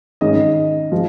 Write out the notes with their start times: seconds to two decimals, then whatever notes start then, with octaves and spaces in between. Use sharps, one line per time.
0.21 G#2 D#3 C#4 D#5
0.92 F3 G#3